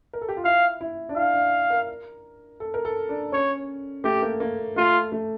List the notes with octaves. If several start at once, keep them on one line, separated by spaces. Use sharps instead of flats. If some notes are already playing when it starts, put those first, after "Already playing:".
A#4
A4
G4
F4
E4 F5
E4
D4
E4 F5
D4
A#4
A4
A#4
A4
D4
C#4 C#5
A3 G4
A#3
A#3
A3 F4
A3